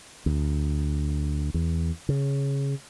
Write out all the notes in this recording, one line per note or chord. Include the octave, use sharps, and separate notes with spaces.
D2
E2
C#3